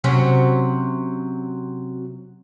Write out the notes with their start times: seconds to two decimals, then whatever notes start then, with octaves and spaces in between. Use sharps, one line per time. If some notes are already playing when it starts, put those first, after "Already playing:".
0.04 C3 F#3 C#4